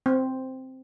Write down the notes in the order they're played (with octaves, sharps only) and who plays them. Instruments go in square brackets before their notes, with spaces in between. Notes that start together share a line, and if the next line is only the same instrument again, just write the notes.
[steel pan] C4